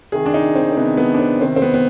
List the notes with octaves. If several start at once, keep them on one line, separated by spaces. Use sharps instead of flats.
C3 D#3 G#4
D4
D#4
C4
C4
C3 D#3 B3
B3
D4
C4
C3 D#3 C4
C4
B3
B3